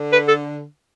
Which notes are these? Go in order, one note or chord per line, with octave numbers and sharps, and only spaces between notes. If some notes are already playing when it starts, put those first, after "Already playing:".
Already playing: D3
B4
A4